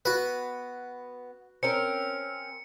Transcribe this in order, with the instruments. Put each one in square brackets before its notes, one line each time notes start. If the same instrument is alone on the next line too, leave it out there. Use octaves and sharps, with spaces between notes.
[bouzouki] B3 [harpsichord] F#4 B4
[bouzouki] C4 C#4 A#4 [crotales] C#7